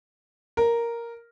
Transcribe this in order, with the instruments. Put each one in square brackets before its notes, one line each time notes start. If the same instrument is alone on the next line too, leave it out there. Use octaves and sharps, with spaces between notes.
[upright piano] A#4